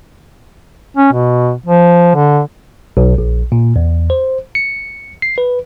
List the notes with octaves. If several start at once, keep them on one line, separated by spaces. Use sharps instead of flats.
C#4
B2
F3
D3
B1
A#1
A#2
E2
C5
C#7
C7
B4